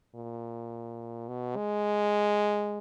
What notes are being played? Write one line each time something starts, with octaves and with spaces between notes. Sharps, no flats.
A#2
B2
G#3